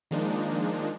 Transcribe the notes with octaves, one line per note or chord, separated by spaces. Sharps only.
D#3 F3 G#3 A#3 D4 D#4